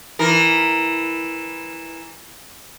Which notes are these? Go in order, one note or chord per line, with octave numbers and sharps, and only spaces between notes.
E3 A#4